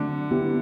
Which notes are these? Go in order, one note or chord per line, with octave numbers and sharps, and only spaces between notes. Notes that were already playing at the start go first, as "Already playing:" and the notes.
Already playing: D3 F#3 A3 C4
B3 E4 G4